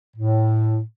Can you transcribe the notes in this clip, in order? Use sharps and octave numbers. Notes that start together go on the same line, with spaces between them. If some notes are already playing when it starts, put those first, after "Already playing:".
A2